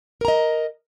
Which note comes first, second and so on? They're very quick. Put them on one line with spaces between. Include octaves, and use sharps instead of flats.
A#4 A#5 D#5